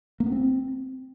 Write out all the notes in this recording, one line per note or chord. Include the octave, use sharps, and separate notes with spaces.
A#3
B3
C4